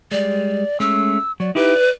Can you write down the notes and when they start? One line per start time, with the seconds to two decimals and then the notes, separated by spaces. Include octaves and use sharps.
0.11 G3 G#3 D5
0.80 G#3 A3 C#4 E6
1.40 F#3 D5
1.55 D#4 E4 G4 B4
1.76 D5